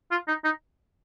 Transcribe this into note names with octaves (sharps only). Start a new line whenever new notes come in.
F4
D#4
D#4